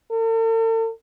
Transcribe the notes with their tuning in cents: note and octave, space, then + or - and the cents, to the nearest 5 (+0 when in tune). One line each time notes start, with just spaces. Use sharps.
A4 +45